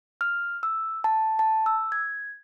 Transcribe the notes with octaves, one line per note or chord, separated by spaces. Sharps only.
F6
E6
A5
A5
E6
G#6